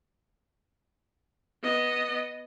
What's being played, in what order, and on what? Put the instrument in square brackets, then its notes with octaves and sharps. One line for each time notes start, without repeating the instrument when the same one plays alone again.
[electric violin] B3 D#5